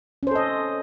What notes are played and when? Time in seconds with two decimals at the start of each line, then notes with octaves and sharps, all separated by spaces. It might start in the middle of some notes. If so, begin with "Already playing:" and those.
0.23 C#4
0.27 C5
0.31 A4
0.35 D#5